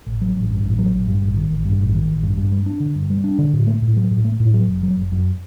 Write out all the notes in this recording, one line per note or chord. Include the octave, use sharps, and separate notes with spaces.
A1
F#3
A1
G2
A1
F#3
A1
G2
A1
D#3
A1
G2
A1
D#3
A1
G2
G2
G3
D4
D3
G2
G3
D4
D3
A2
A3
A2
F#3
A2
A3
A2
F#3
F#1
F#3
F#1
F#2